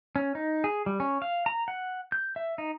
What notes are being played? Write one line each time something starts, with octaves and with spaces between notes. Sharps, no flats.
C#4
D#4
G#4
G3
C#4
F5
A#5
F#5
G6
E5
D#4